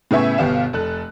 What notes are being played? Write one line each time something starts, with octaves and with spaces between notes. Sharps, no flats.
A2 C#3 B3 E5 G#5 C#6
G1 B2 B3 G4 F5 E7
F1 A4 F#6